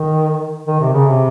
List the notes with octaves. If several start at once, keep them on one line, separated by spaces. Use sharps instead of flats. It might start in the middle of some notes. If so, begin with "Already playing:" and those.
Already playing: D#3
D#3
C3
C#3
C3